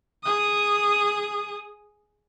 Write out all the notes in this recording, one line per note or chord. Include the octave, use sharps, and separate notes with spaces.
G#4 D#6